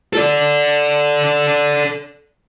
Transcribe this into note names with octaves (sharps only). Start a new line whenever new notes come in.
A4 D5